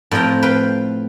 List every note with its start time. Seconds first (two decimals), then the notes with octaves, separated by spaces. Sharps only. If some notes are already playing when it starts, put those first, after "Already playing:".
0.11 A2 F3 C4 G5 A#5
0.43 B4 F5 G5